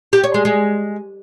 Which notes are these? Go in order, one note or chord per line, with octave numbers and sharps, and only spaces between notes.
G4
C#5
G#3
G#3